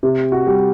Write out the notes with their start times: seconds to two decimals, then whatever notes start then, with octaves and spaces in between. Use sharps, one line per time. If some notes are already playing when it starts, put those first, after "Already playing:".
0.03 C3 G4
0.32 F#4
0.47 G3